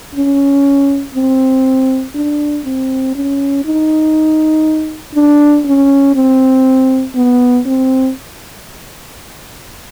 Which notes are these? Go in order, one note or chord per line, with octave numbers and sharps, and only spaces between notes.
C#4
C4
D4
C4
C#4
D#4
D4
C#4
C4
B3
C4